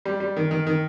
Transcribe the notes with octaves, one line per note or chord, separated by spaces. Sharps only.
G3
G3
D#3
D#3
D#3